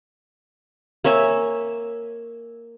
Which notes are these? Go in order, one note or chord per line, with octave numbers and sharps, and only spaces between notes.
A#3 C#5 E5 G#5